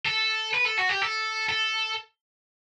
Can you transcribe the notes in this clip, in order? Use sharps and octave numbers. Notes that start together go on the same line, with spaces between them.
A4
B4
A4
F#4
G4
A4
A4